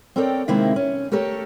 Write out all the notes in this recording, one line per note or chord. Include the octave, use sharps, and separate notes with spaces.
C4 A4 A#4 C#5 D5 G5
C3 D#3 G#3 A#3 C4 E4
C#4
A3 G4 A4 A#4 C#5